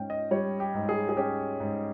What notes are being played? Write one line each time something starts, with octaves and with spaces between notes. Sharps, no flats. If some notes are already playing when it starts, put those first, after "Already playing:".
Already playing: G#2 C#4 G5
D#5
G3 C#5
G4
G#2
G#4
G#4
C#4 G4
G#2